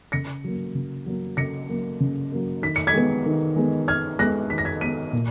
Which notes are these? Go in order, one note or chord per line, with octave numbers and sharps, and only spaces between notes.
C#3 A#6 C#7
F#3 A#3
C#3
F#3 A#3
C#3 A#6 C#7
F#3 A#3
C#3
F#3 A#3
D#3 B6
C#7
G#6 B6
G#3 B3
D#3
G#3 B3
D#3 F6 G#6
G#3 B3 F#6 A#6
D#3 B6
A#6
G#6 B6
G#3 B3 B6 D#7
A#2